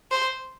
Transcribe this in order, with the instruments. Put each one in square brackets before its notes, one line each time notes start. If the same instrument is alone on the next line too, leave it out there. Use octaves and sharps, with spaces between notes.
[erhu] C5